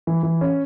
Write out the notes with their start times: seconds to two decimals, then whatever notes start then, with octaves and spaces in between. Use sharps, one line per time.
0.07 E3
0.23 E3
0.41 C#4